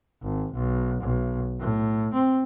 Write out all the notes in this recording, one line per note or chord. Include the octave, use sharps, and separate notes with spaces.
G#1
B1
B1
A2
C4